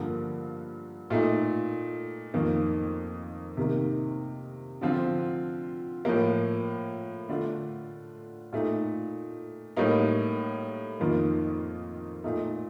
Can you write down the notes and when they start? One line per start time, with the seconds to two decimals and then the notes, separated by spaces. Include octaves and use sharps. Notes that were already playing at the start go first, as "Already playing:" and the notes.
Already playing: G2 D3 F3 A#3
1.10 A#2 A3 D#4
2.34 F2 D#3 A#3
3.57 C3 D#3 A#3
4.81 D3 F3 C4 F4
6.05 A2 F3 A#3
7.29 D3 A3 D4 F4
8.53 A#2 A3 D#4
9.77 A2 G3 A#3 D#4
11.00 F2 D#3 A#3 F4
12.24 A#2 A3 D#4